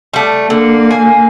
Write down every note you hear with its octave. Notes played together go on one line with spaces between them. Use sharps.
G3 A3
D3 A#3
G#5